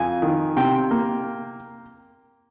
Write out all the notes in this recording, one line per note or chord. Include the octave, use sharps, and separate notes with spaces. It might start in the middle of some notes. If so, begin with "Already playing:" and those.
Already playing: F2 G#5
D#3
C3 G5
A#3